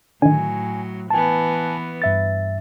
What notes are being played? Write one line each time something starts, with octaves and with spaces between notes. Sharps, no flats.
A2 D3 D#3 F#3 G#5
E3 B3 G#5 A5
G2 E5 A6